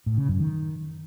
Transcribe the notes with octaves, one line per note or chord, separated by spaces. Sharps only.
A2
C#3
F#2
D#3